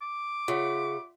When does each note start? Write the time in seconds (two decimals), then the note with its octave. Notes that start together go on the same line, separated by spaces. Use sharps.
0.02 D6
0.48 C#3 F4 E5 F#5